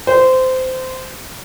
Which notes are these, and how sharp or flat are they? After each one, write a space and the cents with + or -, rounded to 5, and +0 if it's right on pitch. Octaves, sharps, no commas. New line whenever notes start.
C5 -20